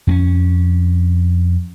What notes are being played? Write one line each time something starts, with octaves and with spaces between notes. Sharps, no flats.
F2 C4 C#4